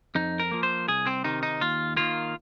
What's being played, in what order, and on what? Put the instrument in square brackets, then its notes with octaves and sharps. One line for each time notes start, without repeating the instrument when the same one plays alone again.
[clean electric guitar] F2 D#4
A#4
F3 A#3
C5
C2 G#4
C4
C3 D#3 D#4
D#4
D#2 F4
D#3 A#3 F4